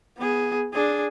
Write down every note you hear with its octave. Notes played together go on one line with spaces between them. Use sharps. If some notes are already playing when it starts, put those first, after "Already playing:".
B3 G#4
D4 G#4